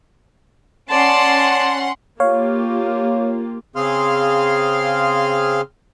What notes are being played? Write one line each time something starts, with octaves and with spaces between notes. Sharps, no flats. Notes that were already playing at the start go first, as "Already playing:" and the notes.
C#4 D5 F#5 A5 C6
A#3 F4 G4 C#5 F5
C#3 C4 G#4 F5 C6 F6